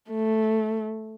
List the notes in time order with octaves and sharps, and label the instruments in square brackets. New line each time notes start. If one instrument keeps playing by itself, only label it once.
[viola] A3